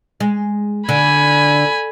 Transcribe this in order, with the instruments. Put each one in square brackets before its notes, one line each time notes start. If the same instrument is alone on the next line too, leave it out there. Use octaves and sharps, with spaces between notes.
[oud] G#3
[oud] D3 [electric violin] G#5 B5